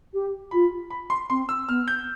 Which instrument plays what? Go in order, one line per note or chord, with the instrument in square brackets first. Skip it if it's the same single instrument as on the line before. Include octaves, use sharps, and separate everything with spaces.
[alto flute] G4
[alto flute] F4 [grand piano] B5
[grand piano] B5
C6
[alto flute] C4 [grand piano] C6
[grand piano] E6
[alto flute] B3 [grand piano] F6
[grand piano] G6